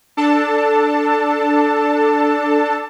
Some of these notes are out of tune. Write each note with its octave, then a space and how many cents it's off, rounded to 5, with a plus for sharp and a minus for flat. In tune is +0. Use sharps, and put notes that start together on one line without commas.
D4 +0 A4 +0 A5 +20